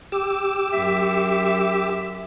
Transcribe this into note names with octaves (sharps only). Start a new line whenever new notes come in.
G4 D6 E6
F#2 E5